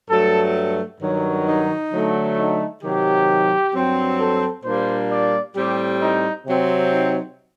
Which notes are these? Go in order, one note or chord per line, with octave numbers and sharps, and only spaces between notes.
G2 F#3 A3 A4
G2 D#3 F#3
D#4
D3 F#3 A3
D#4
C3 D#3 F#3 G4
G2 F#3 C4
A4
A#2 G3 A#3 D4 C5
D5
A2 G3 C4 G4
D#4
C3 F#3 C4
D#4